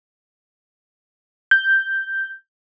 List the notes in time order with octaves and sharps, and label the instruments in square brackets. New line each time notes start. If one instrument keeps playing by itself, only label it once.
[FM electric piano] G6